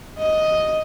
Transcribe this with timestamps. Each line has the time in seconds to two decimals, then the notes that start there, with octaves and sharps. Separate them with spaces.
0.18 D#5